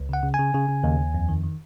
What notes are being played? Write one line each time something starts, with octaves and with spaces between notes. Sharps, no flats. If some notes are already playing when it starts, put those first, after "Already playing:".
Already playing: C#2
C#3 F#5
C#3
G#5
C#3
C#3
C#3
D#2
D#2
F2
D#3
D#3